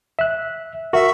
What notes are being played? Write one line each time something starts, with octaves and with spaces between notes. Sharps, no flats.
E5 F#6
F#4 A#4 E5